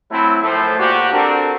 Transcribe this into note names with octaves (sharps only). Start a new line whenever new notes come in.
F#3 A3 C4 E4
F#2 A2 F3 A3 A4 C5
A#2 F#4 G4
C4 D4 F#4 G4 A4 A#4